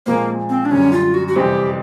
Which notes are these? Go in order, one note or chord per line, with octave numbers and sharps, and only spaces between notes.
A#2 F3 G#3 A#3 C4
C4
D4
F#2 D3 G3 C#4
F4
F#4
F#4
F2 C3 E3 G3 C4 G4